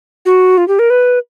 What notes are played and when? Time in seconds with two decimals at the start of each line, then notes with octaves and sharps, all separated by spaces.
0.26 F#4
0.58 F4
0.68 G4
0.79 A#4
0.90 B4